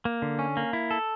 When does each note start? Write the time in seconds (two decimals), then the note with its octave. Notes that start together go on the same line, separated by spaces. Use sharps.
0.05 A#3
0.22 D3
0.39 C#4
0.57 A#3
0.73 E4
0.91 A4